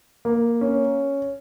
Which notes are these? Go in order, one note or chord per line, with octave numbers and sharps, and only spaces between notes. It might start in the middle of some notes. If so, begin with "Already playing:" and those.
A#3
C#4